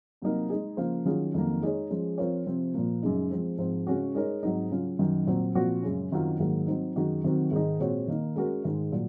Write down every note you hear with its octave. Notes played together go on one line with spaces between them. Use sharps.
C3 F#3 A#3 D#4 A#4
G#3 D#4 G#4
C#3 F3 A#3 F4 C5
D#3 F#3 C#4 F4 G#4
F2 D#3 F#3 A#3
G#3 D#4 G#4 C#5
F3 G#3 C#4 G#4
F3 C4 F4 A#4 C#5
C3 F3 C4
A#2 F3 A#3
F#2 C#3 G#3 D#4
F3 G#3 C4
G#2 F3 C4
C#3 G#3 C#4 F#4
G#3 D#4 A#4 C#5
G#2 F#3 C4 D#4
C#3 F#3 C#4 F4
F#2 D#3 F#3
A#2 F#3 C4
A#2 F3 C4 F#4
F#2 C#3 G#3 C#4
F#2 D#3 F#3 C4 F4
G#2 D#3 F#3 A#3
F#3 C4 D#4
F#2 D#3 G#3 D#4 F#4
C3 D#3 F#3 C4 F#4
G#2 D#3 G#3 D#4
A#2 G#3 C4 F#4 C#5
D#3 A#3 D#4
G#3 C#4 F#4 A#4
G#2 D#3 G#3
A#2 F#3